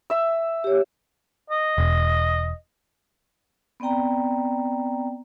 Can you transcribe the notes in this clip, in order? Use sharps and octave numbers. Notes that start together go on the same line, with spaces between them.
E5 E6
G4 C#5
D#5
E1
B3 C4 D5 G5 A#5